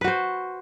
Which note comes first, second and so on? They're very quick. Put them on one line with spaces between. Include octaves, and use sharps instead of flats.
B4 F#4 C5